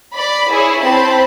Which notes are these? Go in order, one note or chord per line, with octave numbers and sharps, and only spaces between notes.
D5 B5
E4 G#4 C#5
C4 C5 A5 B5